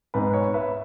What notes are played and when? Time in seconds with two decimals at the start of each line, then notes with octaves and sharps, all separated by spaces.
0.14 G#2 G#3 B3 B4
0.33 C#5
0.54 B4 E5